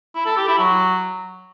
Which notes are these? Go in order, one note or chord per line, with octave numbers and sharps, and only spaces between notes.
E4
A4
G4
E4
F#3